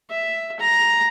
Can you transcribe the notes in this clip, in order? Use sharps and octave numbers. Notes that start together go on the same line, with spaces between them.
E5
A#5